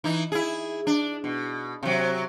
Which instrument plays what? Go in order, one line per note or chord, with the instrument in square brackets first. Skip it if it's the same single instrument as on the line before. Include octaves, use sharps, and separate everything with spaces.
[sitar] E3 D#4
E4 G#4
D4
B2
C3 F#3